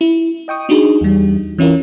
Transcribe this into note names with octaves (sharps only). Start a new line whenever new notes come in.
E4
D#5 G5 C#6 D#6
D4 D#4 F#4 G#4
E2 G3
E3 C#4 E4 F4 A#4